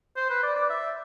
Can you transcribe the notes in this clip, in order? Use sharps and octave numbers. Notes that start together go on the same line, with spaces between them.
C5
B4
D5
D5
E5